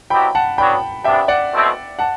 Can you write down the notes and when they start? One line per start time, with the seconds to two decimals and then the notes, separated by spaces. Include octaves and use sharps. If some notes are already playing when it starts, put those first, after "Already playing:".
0.10 B2 F#3 C4 E4 G4 G5 B5
0.35 F#5 A5
0.57 F#3 B3 D4 G5 B5
1.04 C3 E3 B3 D4 E5 G5
1.28 D5 F#5
1.52 B2 A3 C4 E4
1.99 F#5 A5